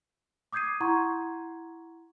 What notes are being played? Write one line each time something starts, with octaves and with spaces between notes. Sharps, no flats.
D6 D#6 G6 G#6 C7 D#7
E4 F#5 A#5 C6 C#6 G#6